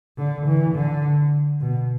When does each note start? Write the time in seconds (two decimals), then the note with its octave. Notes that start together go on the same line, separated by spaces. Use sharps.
0.18 D3
0.47 E3
0.75 D3
1.61 B2